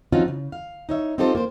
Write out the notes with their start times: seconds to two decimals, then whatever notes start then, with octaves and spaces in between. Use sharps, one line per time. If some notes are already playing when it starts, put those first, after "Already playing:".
0.12 F3 C4 C#4 D#4 F4 F#4
0.28 C#3
0.52 F5
0.89 D#4 C#5 E5
1.18 C4 D#4 F4 G4 A4 C5
1.35 A#3 C5